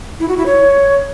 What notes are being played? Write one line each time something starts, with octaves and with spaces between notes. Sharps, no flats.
E4
F#4
E4
C#5